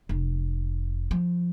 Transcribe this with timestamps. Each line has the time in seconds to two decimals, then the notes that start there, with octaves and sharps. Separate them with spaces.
0.09 F1
1.11 F3